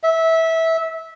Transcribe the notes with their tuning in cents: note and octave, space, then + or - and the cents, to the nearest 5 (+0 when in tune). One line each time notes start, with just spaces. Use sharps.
E5 -20